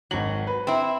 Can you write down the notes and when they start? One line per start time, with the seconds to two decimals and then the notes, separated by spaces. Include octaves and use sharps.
0.11 G#1 F#3 F#7
0.47 B4
0.67 C4 E4